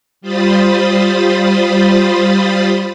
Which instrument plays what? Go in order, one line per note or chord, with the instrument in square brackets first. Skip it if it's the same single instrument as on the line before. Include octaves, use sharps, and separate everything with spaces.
[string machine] G3 F4 C5 B5 D#6 A6